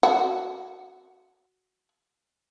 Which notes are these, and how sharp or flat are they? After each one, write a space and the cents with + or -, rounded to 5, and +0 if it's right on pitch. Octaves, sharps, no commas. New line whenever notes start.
F#4 +0 F#5 +0